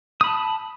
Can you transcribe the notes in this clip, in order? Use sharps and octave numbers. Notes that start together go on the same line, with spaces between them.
A5 B5 D#6